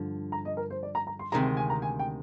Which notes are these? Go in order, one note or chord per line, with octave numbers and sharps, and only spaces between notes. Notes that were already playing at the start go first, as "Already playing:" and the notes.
Already playing: G2 D3 F3
A#5
D#5
A#4
C5
D5
A#5
A#5
C6
D2 C3 D#3 G#3 A#5
G#5
A#5
G#5
G5